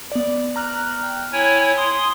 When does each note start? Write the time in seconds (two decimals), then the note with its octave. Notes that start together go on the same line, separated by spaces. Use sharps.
0.12 B3 D5
0.56 A#5 F6 F#6
1.03 G5
1.32 E4 C#5 G#5
1.77 C6 D#6